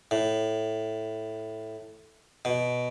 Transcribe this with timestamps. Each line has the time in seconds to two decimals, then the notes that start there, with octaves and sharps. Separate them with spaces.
0.11 A2
2.45 B2